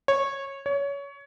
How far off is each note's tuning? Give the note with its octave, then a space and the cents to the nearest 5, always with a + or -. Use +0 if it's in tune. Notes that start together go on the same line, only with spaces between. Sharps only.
C#5 -15
C#5 +20